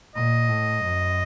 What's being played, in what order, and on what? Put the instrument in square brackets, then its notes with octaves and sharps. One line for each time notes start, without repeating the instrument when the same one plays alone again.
[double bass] A#2 [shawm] D#5
[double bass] A2
F#2